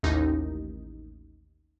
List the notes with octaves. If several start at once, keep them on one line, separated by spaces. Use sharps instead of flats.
A1 D#2 D#4